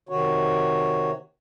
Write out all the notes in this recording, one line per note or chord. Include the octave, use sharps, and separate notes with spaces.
C3 D#3 F#4 C#5